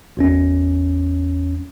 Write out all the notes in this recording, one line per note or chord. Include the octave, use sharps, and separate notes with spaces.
G#1 E2 C#4